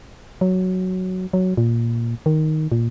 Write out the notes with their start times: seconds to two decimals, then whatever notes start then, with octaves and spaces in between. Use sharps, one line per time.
0.41 F#3
1.33 F#3
1.57 A#2
2.26 D#3
2.72 A#2